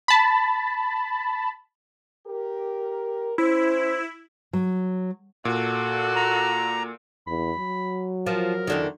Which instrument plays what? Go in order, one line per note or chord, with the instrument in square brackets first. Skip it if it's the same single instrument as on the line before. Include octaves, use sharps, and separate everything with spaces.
[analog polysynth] A5 B5
[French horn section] G4 A#4
[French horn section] C#4 C5 [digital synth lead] E4
[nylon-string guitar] F#3
[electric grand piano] A#2 [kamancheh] F#4 A4
[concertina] A#5
[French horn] E2 [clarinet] B5
[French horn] F#3
[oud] F3 [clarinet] A#4
[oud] E2 D3 D#3